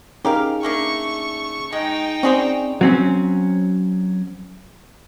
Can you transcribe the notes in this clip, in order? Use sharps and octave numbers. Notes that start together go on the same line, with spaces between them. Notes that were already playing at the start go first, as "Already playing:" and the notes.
C#4 D#4 G4 G#4 A#4 F5
A3 A#3 D4 C#6
G#3 D#4 G5
C4 C#4 F#4 G#4 C5 D5
F#3 C4 C#4